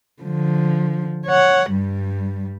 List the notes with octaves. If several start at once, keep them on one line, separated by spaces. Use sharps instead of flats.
D3 F3
C#5 F#5
G2 G3